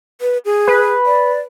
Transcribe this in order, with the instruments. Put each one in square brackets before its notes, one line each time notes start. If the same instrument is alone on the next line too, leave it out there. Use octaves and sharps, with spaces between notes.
[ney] B4
G#4
[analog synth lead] B4
[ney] D5